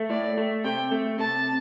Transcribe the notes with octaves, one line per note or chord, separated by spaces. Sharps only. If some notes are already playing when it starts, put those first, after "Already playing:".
Already playing: A3
A2 D5
A3
C3 G5
A3
C3 A5